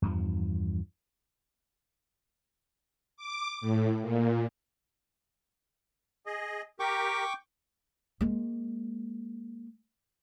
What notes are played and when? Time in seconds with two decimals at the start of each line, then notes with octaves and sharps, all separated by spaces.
0.02 E2 G2 F3
3.17 D6
3.61 A2
4.02 A#2
6.26 G#4 D#5
6.80 G4 A#4 G5 C#6 D6
8.21 G#3 A#3